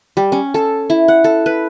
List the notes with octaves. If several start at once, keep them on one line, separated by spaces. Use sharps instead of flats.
G3
C#4
A4
E4
F#5
A4
B4